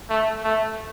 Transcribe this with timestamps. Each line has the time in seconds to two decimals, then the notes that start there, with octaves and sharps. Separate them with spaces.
0.10 A3
0.44 A3